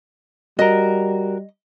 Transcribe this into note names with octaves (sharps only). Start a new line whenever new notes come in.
G3 F#4 A#4 D#5